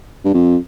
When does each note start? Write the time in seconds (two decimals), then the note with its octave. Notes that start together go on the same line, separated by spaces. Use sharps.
0.25 G2
0.34 F2